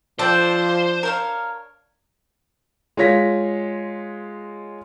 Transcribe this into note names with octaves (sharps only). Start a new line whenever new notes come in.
F3 D4 A4 C5 D5 G5
A#4 C#5 F5
G#3 F4 C#5 A#6 B6